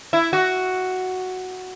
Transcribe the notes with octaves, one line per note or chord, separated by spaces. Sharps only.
E4
F#4